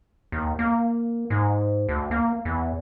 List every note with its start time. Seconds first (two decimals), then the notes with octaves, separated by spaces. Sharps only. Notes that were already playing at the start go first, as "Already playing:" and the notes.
0.32 D#2
0.59 A#3
1.30 G#2
1.89 D2
2.11 A#3
2.45 E2